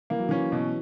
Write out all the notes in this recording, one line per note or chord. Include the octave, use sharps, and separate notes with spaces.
E3 A#3
F#3
E3 C#4
B2